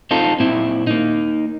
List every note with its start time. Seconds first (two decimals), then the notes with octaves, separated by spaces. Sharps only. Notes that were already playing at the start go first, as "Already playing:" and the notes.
0.11 C4 D#4 F4 A4
0.40 A#2 C4 E4
0.87 A#3 D#4